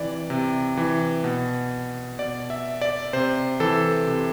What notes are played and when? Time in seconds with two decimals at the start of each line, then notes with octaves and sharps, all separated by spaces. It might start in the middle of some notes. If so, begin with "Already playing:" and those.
Already playing: C3 E3 D5
0.30 C3
0.77 E3
1.24 B2
2.19 B2 D5
2.50 E5
2.81 D5
3.13 C3 C5
3.60 E3 A4
4.07 C3